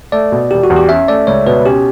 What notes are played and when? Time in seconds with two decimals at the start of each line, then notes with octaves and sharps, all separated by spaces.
0.12 A3 D5
0.32 B2
0.51 E1 G4
0.64 F#4
0.70 E2
0.76 G4
0.89 C#4 E5
1.08 A3 D5
1.27 C#2 C#5
1.47 B2 B4
1.66 C#4 G4